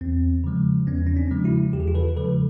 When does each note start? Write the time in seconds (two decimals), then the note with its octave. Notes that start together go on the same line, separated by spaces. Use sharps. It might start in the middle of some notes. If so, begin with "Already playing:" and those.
0.01 E2 C4
0.44 C#3 F3 G#3
0.87 E2 B3 C#4
1.07 C#4
1.16 C4 D4
1.31 C#3 F3 G#3
1.44 E4 F#4
1.73 E2 G4
1.80 G#4
1.87 F4 G4
1.95 A4 B4
2.16 C#3 F3 G#3 A4 B4